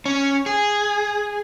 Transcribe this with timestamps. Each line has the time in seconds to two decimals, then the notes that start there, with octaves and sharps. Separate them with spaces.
0.06 C#4
0.46 G#4